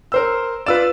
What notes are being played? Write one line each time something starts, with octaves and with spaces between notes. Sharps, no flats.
A#4 C5 E6
F4 B4 D5 E6 E7